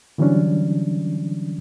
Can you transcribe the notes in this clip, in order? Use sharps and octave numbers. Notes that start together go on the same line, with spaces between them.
D3 E3 F#3 G3 C#4 D4